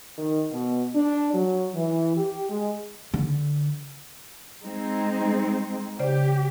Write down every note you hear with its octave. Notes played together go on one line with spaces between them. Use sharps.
D#3
B2
D4
F#3
E3
G4
G#3
D3
G#3 C4 D#4
C#3 G4 C5 D5